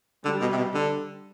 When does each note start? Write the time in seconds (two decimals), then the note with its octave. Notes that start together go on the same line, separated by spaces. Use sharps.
0.25 D3 G3
0.41 B2
0.52 C3
0.57 B2
0.74 D3